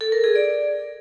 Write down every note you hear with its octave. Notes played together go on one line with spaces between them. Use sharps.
A4
A#4
G#4
D5